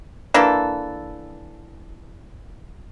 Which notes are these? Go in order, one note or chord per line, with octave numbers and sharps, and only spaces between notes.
E3 A#3 D4 A4